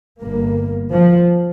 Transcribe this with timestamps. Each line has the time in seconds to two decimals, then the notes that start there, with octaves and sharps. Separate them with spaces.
0.21 G1 G2 A#3
0.91 F3